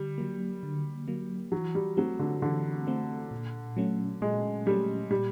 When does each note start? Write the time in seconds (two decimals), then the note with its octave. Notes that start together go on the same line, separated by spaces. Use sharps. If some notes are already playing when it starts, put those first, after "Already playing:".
Already playing: D3 G3
0.18 F#3 A#3
0.63 D3
1.08 F#3 A#3
1.52 E3 F#3
1.75 G3
1.97 F#3 A3 C4
2.19 D3
2.42 D3 E3
2.87 A3 C4
3.31 A#2
3.77 F#3 A3 C#4
4.21 A#2 G#3
4.66 F#3 G3 A3 C#4
5.11 A#2 G3